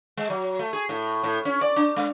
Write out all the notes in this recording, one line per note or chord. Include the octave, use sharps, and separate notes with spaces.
G#3
F#3
A3
G#4
A2
A2
C#4
D5
D4
G#3